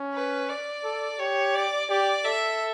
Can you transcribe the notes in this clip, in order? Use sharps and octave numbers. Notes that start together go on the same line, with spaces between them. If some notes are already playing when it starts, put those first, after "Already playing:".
Already playing: C#4
B4
D5
A4
G4 C#5
D5
G4 D5
A4 E5